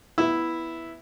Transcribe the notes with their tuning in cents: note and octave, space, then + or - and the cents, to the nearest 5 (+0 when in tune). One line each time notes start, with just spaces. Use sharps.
B3 +0 E4 +0 E5 +0